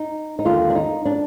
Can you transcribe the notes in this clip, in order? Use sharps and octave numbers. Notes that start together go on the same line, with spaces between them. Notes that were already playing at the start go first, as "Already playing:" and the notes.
Already playing: D#4
D#4
D#2 D3 F4
D4
D#4
D4